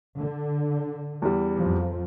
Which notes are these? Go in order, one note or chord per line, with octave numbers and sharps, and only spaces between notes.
D3
E2 G3
F2 F3